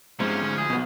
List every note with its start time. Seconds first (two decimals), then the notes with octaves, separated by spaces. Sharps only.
0.20 E2 G#2 C3 F3 C#4
0.42 D2
0.57 G#4
0.70 B1 B2 B3